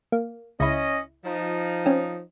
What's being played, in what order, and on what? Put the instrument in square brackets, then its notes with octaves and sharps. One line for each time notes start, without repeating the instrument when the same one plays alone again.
[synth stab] A#3
[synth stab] C#2 E4 [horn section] C#4 D#5
[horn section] F3 D#4
[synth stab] C4 C#4